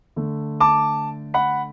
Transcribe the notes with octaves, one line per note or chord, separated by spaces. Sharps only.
D3 A3
A5 D6
F#5 B5